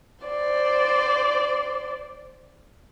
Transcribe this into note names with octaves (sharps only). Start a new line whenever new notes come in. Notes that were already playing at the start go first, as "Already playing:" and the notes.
C5 D5